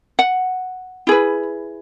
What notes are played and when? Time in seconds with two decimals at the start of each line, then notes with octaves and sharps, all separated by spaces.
0.19 F#5
1.07 E4 G#4 B4